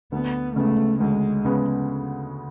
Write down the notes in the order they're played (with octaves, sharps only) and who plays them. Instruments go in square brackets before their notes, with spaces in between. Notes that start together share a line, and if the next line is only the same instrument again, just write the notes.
[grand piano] D2 [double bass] B3
[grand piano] C#3 G#3 B3 [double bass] A3
[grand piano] D2 [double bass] G#3
[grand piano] C#3 G#3 B3